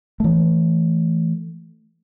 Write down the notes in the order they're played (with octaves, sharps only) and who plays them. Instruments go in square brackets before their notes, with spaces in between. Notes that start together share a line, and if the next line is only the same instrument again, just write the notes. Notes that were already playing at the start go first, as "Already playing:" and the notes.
[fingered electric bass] E3 A3